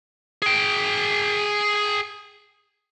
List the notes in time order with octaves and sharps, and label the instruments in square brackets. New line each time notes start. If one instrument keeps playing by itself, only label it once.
[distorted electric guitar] G#4 G5